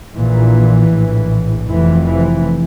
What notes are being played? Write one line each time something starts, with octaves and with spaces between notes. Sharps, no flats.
A#1 A#2 E3
A#1 A2
F1 F2 C3 E3
E3